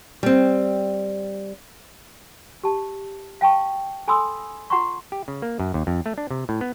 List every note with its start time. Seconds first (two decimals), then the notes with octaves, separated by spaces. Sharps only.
0.23 G3 C4
2.63 G4 A5
3.41 F5 G5 A5 C#6
4.08 A4 G#5 B5 C6 D#6 E6
4.70 F4 F#5 A#5 C6 C#6
5.12 G4
5.28 C#3
5.42 A#3
5.60 F#2
5.74 D#2
5.87 F2
6.06 A3
6.18 D4
6.31 C3
6.49 A2
6.61 B3